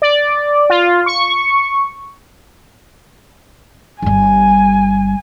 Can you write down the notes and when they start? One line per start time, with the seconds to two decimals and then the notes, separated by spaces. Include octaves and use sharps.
0.02 D5
0.70 F4
1.06 C#6
4.02 G1 G3 G#5